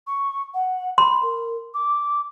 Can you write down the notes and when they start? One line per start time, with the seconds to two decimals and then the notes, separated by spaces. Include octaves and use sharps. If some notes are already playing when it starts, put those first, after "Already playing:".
0.07 C#6
0.54 F#5
0.98 B5 C6
1.22 A#4
1.74 D6